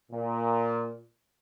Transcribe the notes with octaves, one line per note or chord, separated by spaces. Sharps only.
A#2